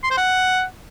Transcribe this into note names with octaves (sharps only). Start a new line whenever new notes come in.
C6
C5
F#5